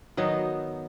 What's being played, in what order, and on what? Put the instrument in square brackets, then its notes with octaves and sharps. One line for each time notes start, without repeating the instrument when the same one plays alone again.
[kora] D#3 F#3 B3 D#4